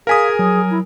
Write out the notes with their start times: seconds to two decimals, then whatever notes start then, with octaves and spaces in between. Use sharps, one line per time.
0.07 G#4 A#4 F5 G#5 D#6 B6
0.39 F#3
0.71 E4